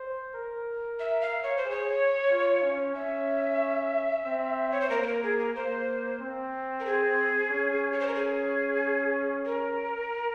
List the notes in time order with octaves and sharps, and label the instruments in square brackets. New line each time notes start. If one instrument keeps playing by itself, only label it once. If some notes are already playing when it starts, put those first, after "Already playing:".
Already playing: [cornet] C5
A#4
[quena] E5
F5
C#5
C5
[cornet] G#4
[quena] C#5
[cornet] F4
C#4
[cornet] C#4 [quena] E5
[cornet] C4
[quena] C#5
C5
[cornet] A#3 [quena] A#4
[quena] C5
A#4
G#4
A#4
[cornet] A#3 [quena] C5
[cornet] C4
[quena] A#4
G#4
[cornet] C#4
[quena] C#5
C5
A#4
G#4
A#4